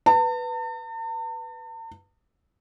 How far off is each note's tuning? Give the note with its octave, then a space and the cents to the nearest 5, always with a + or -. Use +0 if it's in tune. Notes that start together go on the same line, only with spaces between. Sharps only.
B4 +0 A5 +45